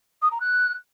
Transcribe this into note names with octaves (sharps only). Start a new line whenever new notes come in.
D#6
A#5
F#6